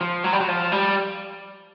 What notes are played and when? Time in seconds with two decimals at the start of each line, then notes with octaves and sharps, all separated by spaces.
0.01 F3
0.24 F#3
0.33 G3
0.40 F#3
0.48 F3
0.72 G3